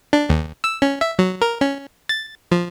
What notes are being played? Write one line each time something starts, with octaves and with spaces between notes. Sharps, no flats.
D4
D#2
E6
C#4
E5
F#3
A#4
C#4
A6
F3